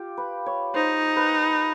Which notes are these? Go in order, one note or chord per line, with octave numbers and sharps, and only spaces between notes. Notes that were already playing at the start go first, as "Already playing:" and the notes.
Already playing: F4 G4
B4
C#5
D#4 C5
B4